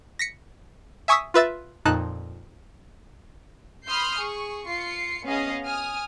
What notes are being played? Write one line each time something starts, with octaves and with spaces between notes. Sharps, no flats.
A#6 B6 C#7
E5 G#5 C#6 D#6 E6 B6
F4 B4 E5 A6
F2 A#2 D#4 A5 F#6
B5 C6 D#6 F6 G6 C7
G#4 C#6
F4 C7 C#7
B3 C#4 G#4 D#5 F5
G#5 D#6 F6